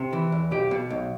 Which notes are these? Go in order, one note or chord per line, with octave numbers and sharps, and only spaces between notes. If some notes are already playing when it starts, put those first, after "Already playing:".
Already playing: C3
E3
E2
B1 G4
B2
B1